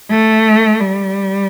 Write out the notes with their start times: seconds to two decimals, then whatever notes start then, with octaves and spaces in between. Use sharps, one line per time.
0.10 A3
0.80 G3